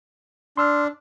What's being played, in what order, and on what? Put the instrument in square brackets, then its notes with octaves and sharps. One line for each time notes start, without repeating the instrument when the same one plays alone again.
[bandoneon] D4 [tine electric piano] C6 E6 F6